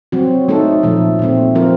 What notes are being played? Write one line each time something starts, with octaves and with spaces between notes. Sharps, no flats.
F#3 C4 F#4
A3 D#4 A4
A#2 F3 A3
A#2 A3 C4
F3 C4 F4 A#4